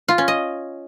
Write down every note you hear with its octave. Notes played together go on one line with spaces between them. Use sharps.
F4
C#4
D#5